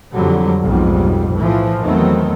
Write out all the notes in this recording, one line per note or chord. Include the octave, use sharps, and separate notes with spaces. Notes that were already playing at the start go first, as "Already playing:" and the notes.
F2 D3 F#3 G3
B1 F2 G#2 G3
A2 E3 F3
E2 D#3 F#3 A3 B3 C4